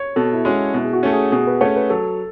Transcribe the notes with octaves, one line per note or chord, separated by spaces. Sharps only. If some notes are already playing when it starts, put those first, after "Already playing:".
Already playing: C#5
B2 A4
E4
G#3 C#4 F#4
B2 E4
G#4
F#4
A3 C#4
G#4
B2 G#4
B4
A3 C#4 C#5
B4
F#3 A4